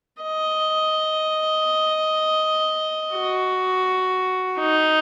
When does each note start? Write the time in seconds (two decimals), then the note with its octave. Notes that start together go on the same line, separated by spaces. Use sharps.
0.23 D#5
3.15 F#4
4.59 D#4